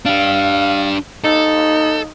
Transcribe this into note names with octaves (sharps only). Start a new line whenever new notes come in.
D4 G4 F5
D#4 A4